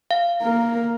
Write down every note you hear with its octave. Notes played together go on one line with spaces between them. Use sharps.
F5
A#3 A#4